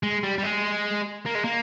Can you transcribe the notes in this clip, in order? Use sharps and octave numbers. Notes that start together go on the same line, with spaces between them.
G#3
G3
G3
G#3
A#3
G#3
A#3